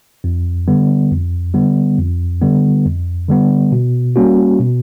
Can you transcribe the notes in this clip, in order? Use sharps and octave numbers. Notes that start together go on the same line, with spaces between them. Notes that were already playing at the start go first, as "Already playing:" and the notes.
F2
D3 G3 B3
F2
D3 G3 B3
F2
D3 G3 B3
F2
D3 G3 B3
B2
G3 A#3 C#4 F#4
B2